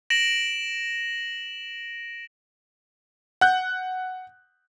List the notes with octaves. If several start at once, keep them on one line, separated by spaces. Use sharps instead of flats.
A#6 D7 E7 F#7
F#5 F#6 G6